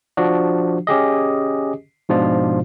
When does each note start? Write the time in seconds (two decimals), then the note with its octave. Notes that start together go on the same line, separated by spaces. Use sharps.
0.17 F3 D4 F#4
0.87 C#4 G4 G#4 D#5
2.09 G#2 B2 F3 D4 F4